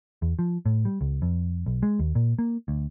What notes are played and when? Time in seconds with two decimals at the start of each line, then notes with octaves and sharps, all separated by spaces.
0.22 E2
0.39 F3
0.66 A2
0.85 G3
1.01 C#2
1.22 F2
1.66 B1
1.83 G#3
1.99 D#2
2.15 A#2
2.39 A#3
2.68 D2